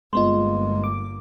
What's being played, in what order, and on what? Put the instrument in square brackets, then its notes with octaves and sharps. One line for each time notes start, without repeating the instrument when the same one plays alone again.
[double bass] G1 A#3 [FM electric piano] G#3 B3 F4 [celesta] D#5 C6
[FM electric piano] D6